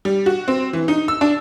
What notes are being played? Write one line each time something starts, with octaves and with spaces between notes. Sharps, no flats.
G3
F#4
C4
E3
D#4
E6
D4